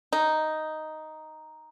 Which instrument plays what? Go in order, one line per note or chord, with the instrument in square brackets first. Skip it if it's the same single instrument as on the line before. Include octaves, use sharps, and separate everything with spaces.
[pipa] D#4